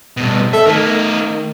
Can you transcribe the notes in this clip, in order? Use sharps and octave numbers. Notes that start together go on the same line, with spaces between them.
G2 B2
A4 E5
D#3 A3 A#4